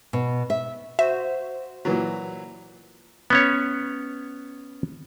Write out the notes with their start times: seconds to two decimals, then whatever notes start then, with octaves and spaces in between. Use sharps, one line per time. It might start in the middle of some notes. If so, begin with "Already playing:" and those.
0.13 B2
0.50 E5
0.99 F#4 C5 E5
1.85 A#2 E3 F#3
3.30 B3 C#4 C#5